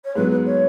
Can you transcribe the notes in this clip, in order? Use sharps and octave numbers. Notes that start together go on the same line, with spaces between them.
C#5
G#2 F#3 B3 B4
B4
C#5